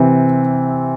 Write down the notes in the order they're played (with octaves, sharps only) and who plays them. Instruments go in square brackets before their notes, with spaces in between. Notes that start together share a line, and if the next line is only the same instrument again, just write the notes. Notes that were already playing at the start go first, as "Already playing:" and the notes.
Already playing: [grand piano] C3 E3 C4